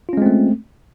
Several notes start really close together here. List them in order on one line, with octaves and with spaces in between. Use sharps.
F4 C#4 G#3 C4 A3